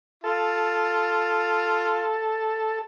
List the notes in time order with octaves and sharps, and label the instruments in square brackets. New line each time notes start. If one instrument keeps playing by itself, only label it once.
[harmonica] F4 [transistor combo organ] A4